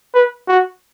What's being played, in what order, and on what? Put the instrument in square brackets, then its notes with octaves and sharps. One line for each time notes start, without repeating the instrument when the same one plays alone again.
[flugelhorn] B4
F#4